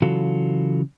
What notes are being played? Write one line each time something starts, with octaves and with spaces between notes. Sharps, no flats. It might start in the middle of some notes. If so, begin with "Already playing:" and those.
C#3 E3 F#3 F4 F#4 A4